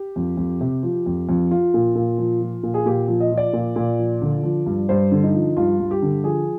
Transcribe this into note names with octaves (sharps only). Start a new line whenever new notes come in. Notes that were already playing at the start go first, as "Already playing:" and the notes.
Already playing: G4
F2
F2
C3
F3
F2
F2
F3 F4
A#2
A#2
F3
F3
A#2
G#4
A#2 G4
F3
D#5
F3
D5
A#2
A#2
F3
D3
F3
G2
G2 C5
D3
D#4
F3
G2 F4
G2
G4
D3
F3 G#4